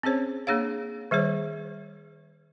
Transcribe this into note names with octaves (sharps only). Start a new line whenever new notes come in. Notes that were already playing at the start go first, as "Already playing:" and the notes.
C4 C#4 G#4 C5 C#5
A#3 D4 G#4 C#5 F5
D#3 G3 G#4 C5 C#5